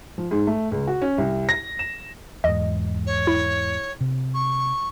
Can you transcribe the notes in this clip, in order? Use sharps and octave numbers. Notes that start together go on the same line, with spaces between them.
F3
G#2
A3
C#2
F#4
C#4
C2
A#6
E7
E2 G#2 D#5
C#5
E4
C3
C#6